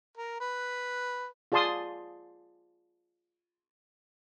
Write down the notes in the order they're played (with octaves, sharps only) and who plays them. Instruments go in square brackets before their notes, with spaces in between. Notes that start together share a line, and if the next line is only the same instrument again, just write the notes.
[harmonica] A#4
B4
[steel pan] F4 G#4 D5 A5 C6 D#6